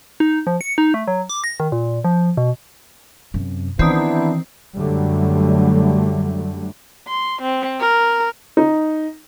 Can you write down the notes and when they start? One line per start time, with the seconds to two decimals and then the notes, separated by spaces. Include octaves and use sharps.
0.20 D#4
0.47 F3
0.61 C#7
0.78 D#4
0.94 A3
1.08 F#3
1.30 D6
1.44 A#6
1.60 D#3
1.72 A#2
2.04 F3
2.37 B2
3.34 F#2 C3
3.79 D#3 E3 B3 C4 D4 E4
4.77 F#2 D3 F#3 G3 A3
7.08 C6
7.42 C4
7.80 A#4
8.57 D#4